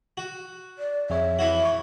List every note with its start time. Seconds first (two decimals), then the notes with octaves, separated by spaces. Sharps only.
0.17 F#4
0.79 D5
1.10 F2 G#4 C#5 E5
1.39 E3 E4 F#4
1.63 C#6